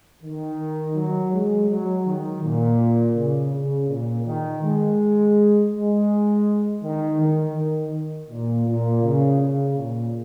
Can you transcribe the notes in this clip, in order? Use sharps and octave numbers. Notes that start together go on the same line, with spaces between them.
D#3
F#3
G#3
F#3
D#3
A#2
C#3
C#3
A#2
D#3
G#3
G#3
D#3
D#3
D#3
A#2
A#2
C#3
C#3
A#2